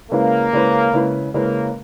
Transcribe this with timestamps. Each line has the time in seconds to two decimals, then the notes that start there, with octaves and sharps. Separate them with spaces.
0.11 C#3 G#3 A#3 C#4 E4 B4
0.53 C#3 G#3 C#4 E4 B4
0.93 C#3 G#3 C#4 E4 B4
1.34 C#3 G#3 A#3 C#4 E4 B4